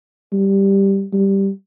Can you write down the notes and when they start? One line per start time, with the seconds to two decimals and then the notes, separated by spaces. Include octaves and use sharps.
0.32 G3
1.13 G3